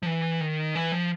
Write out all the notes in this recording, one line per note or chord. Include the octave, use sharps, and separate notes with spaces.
F3
E3
D#3
E3
F3